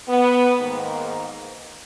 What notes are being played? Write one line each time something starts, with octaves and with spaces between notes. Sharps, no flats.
B3
G#2 D#3 A#3